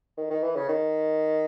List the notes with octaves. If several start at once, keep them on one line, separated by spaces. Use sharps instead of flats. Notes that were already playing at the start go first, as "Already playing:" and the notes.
D#3
D#3
E3
C#3
D#3